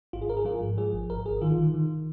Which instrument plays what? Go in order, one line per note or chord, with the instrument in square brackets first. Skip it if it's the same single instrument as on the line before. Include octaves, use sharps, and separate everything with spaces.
[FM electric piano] G#1 F4
G#4
G#1 A#4
G#4
F3 F4
G#2
F3 G#4
G#1
G#1 A#4
G#1 G#4
D#3 F4
D#3
D#3